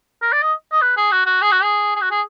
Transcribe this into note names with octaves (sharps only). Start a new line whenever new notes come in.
A#4
D5
D#5
D#5
B4
G#4
F#4
F#4
G#4
F#4
G#4
G#4
F#4
G#4